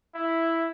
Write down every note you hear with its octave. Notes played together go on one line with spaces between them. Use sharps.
E4